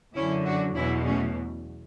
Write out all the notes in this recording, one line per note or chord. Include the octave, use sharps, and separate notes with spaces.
F#2 D3 F#3 C#4 E4
D4 F#4
E2 B2 F#3 C#4 E4
A3 C#4